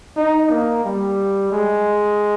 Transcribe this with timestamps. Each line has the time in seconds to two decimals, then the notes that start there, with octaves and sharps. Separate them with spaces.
0.16 D#4
0.50 A#3
0.84 G3
1.52 G#3